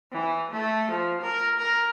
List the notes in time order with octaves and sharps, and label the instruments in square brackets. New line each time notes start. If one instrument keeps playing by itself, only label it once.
[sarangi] E3
A3
F3
A#4
A#4